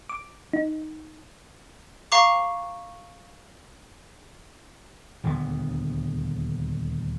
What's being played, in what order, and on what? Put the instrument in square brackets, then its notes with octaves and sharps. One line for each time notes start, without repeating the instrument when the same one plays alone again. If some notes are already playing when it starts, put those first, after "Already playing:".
[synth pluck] D6
D#4
[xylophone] F5 A#5 C#6 D6
[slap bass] D#1 D2 D3 B3